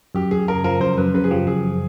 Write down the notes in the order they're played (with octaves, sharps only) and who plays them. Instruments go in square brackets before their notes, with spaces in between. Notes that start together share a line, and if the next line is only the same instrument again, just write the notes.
[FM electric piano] F#2 [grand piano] G4
[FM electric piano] F#2 [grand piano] G#4
[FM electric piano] C#3 [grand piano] A#4
[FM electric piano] F3 [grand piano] A#4
[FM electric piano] F#2 [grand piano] C5
[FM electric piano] F#2 [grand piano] B4
[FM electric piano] C#3 [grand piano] B4
[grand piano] G#4
[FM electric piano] F3 [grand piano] G4
[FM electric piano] F#2 [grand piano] G#4